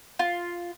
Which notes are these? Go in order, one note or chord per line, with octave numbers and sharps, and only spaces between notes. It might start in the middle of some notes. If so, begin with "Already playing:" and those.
F4